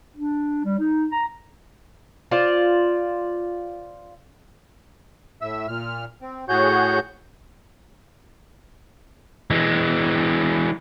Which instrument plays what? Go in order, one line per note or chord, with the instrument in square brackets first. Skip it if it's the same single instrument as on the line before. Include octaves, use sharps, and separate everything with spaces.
[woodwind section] D4
G3
D#4
A#5
[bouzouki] F4 C5 D5
[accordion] A2 E5 E6
A#2 F6
C4
[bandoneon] A2 F#4 G6 [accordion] G#4 C#5 F#5
[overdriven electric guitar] E3 G#3